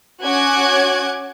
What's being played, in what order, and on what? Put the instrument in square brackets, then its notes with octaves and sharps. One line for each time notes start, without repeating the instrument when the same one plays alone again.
[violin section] C#4 F#4 G#5 D6 F#6 G#6